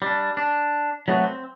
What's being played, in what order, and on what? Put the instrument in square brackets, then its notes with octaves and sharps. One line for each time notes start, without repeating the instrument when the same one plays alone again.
[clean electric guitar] G3 D4
D4
F#3 A3 B3 C4 F4 F#4
C4